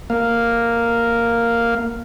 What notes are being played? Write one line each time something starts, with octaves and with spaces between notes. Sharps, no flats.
A#3 F5